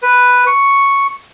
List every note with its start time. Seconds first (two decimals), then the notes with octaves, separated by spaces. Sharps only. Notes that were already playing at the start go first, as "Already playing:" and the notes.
0.02 B4
0.47 C#6